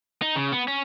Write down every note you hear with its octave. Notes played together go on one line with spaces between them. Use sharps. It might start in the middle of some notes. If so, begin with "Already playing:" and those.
D#4
C#3
B3
C#4